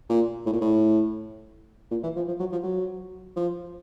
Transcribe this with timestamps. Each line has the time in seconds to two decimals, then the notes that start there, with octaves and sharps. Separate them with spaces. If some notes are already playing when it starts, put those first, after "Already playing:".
0.09 A#2
0.46 A2
0.53 A#2
0.61 A2
1.91 A#2
2.03 E3
2.16 F3
2.28 F3
2.40 F#3
2.52 F3
2.64 F#3
3.36 F3